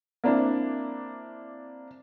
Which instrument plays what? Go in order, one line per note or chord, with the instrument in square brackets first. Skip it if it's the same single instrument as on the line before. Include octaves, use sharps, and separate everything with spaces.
[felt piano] A#3 C4 D4 E4